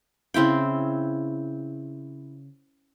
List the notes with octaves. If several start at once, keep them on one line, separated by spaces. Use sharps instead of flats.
C#3 C4 E4 G5